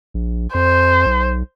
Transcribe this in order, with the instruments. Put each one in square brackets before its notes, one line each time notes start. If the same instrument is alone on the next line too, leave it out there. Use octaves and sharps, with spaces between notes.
[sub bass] A#1
[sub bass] F2 [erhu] C5
[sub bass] B1